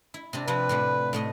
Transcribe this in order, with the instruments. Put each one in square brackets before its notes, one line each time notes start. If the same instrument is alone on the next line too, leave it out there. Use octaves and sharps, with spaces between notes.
[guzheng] E4
C3 C4 D4
[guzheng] C3 F3 C4 [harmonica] B4
[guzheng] A2 F3 G3
A2 A3 D#5